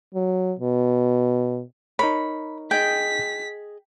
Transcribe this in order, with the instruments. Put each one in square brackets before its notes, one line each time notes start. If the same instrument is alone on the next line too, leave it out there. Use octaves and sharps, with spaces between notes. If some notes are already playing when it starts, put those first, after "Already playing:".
[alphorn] F#3
B2
[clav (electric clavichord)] D#4 A#4 C#5 [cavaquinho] B5
[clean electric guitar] G#4 D#5 [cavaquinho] G5 [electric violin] B6